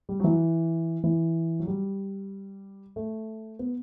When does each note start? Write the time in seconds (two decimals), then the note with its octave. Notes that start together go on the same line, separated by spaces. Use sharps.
0.09 G3
0.20 F#3
0.24 E3
1.04 E3
1.59 F#3
1.67 G3
2.96 A3
3.59 B3